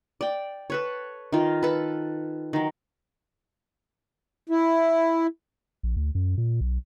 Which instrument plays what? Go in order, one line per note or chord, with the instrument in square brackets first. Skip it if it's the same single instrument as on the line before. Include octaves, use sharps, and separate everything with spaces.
[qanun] D5 G5
A4 B4 C#5
D#3 F4
A4 B4
D#3 F#3
[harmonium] E4
[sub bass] A#1
D2
F#2
A#2
B1